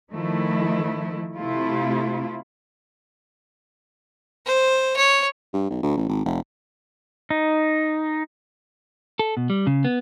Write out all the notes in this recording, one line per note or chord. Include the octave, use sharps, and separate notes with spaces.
D#3 F3 A3 E4
C3 A3 E4 F4
C5
C#5
G2
B1
D2
A1
G#1
F1
D#4
A4
B2
G3
C#3
B3